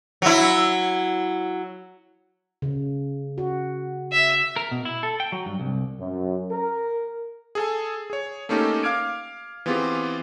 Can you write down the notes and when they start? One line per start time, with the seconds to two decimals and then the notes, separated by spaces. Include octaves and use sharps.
0.22 F#3 E4
2.62 C#3
3.38 F#4
4.12 E5
4.56 A#4
4.71 B2
4.85 E4
5.03 A4
5.20 G5
5.32 F#3
5.46 G2
5.60 C2
6.00 F#2
6.52 A#4
7.55 G#4 A4 G#5
8.10 G#4 C#5
8.49 A3 A#3 C#4 D#4 G4 A4
8.83 F5 D6 F6 G#6 D7
9.66 E3 B3 C4 F4 G4 G#4